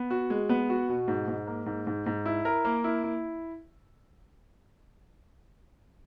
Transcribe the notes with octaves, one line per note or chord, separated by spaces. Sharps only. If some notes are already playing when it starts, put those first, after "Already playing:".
Already playing: B3
F#4
G#3
B3
F#4
B2
G#2
G#2
A#3
G#2
G#2
G#2
E4
A#4
A#3
E4
E4